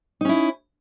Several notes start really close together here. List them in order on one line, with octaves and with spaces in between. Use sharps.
D#4 C#4 E4